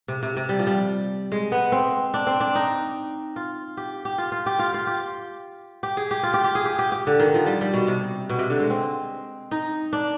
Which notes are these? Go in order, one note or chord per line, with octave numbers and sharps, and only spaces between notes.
C3
C3
C3
G3
F3
G3
G#3
B3
C4
D4
C4
D4
D#4
F4
G4
G4
F4
F4
G4
F4
F4
G4
G4
G#4
G4
F4
G4
G4
G#4
G4
G4
G4
D3
D#3
F3
G3
G3
B2
C3
B2
C3
D3
G#3
C4
D#4
D4